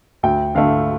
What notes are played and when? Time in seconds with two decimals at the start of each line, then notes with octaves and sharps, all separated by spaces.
0.23 D2 G5
0.55 D3 A3 F5